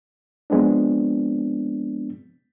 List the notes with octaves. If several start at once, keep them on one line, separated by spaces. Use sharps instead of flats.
F3 G#3 B3 C4 D4